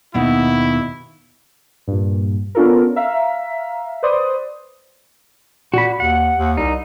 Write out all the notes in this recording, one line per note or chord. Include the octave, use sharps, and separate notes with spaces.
D#2 B2 D#4 E4
G2 A#2
B3 C#4 D4 F4 A4 A#4
E5 F5 A#5 B6
B4 C5 D5 C6 D#6
A#2 F#4 B5
D#2 F#5
D#2
C2 D#4